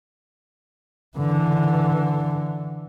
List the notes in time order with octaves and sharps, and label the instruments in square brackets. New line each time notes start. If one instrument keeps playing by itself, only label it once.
[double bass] D3 E3